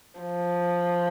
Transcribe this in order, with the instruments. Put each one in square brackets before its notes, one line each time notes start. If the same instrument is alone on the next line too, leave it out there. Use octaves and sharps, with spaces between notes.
[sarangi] F3